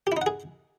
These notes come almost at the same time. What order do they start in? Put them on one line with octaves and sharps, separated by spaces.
G4 E4 D#4 F#5 G#4